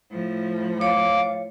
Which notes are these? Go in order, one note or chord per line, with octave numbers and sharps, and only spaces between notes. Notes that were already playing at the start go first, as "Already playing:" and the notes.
A2 F3
C#5 F5 D6